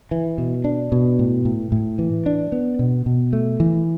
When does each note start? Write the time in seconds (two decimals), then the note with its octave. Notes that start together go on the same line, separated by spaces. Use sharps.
0.11 E3
0.38 B2
0.64 D4
0.92 B2
1.19 A2
1.45 A2
1.72 A2
1.99 E3
2.26 D4
2.52 B3
2.79 B2
3.06 B2
3.33 A3
3.60 E3